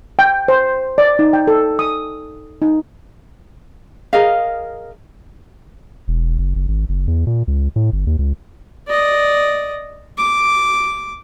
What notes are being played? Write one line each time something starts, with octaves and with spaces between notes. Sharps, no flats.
G5
C5
D5
D#4
G5
A4
D#6
D#4
G#4 A#4 D#5 F5
E1
F#1
F#1
G#1
F#1
E2
A#2
C#2
A2
G1
D#2
C#2
D5 D#5
D6